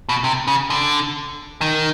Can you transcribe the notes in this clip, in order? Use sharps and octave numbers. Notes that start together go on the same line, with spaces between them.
B2
C3
C#3
D3
D#3